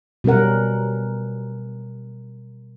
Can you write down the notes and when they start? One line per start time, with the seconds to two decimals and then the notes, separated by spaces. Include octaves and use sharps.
0.24 B2 G3 C#4 A#4 F#5